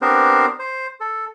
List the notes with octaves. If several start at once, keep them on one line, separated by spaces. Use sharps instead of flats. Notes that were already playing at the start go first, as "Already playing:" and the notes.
B3 C4 D4 G4 A#4 C5
C5
A4